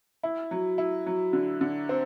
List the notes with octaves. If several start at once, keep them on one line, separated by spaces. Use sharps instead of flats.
E4
F#3
E4
F#3
D3
D3
C4